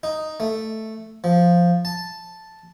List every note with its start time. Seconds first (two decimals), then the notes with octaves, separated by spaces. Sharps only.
0.03 D#4
0.40 A3
1.24 F3
1.85 A5